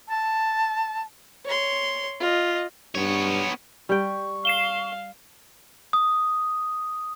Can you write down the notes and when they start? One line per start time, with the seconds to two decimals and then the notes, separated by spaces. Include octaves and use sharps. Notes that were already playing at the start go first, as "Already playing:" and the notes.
0.08 A5
1.45 C#5 C6
2.20 F4 D#5
2.95 G2 B3 C#5
3.89 G3 G5 C#6
4.45 F5 C7 E7 G7
5.93 D#6